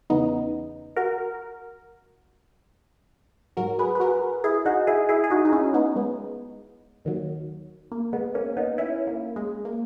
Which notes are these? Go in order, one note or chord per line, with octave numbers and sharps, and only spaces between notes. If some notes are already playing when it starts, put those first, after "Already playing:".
E2 C#3 E3 B3 D#4
F#4 A#4
G#2 F#3 F#4 A#4
G#4 B4
B4
F#4 A#4
E4 G#4
D#4 F#4
E4 G#4
E4 G#4
G#4
D#4 F#4
D#4
C#4 E4
B3 D#4
G#3 B3
D#2 D#3 F#3
A#3
G#3 B3
A#3 C#4
B3 D#4
C#4 E4
A#3
G#3
A#3